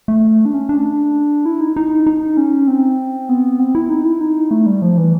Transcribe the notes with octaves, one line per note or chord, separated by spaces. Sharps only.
A3
D4
C#4
D4
E4
D#4
D#4
D#4
C#4
C4
B3
C4
E4
D#4
E4
D#4
A3
G3
F3
E3